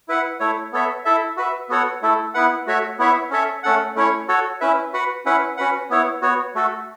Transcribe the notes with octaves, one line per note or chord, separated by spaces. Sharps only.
E4 B4 F#5
A3 E4 C#5
B3 A4 C#5 E5
E4 A4 E5
F#4 B4 E5
B3 F#4 A4 C#5 F#5
A3 E4 A4
B3 E4 B4 F#5
A3 F#4 C#5 E5
B3 E4 C#5 E5
C#4 A4 C#5 E5
A3 C#4 A4 F#5
A3 C#4 E4 C#5
F#4 A4 C#5
C#4 E4 B4 E5
F#4 B4 F#5
C#4 E4 B4 F#5
C#4 F#4 B4 F#5
B3 E4 C#5
B3 F#4 C#5
A3 F#4 A4